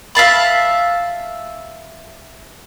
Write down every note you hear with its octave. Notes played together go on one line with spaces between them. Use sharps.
E5 F5 A5 B5